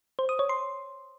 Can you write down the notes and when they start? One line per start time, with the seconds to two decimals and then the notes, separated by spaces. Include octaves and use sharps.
0.19 C5
0.29 D#6
0.39 C#5
0.49 C6